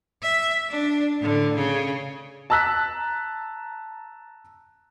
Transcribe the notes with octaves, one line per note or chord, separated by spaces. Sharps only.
E5
D4
A2 D3
C#3
A5 A#5 E6 F#6 B6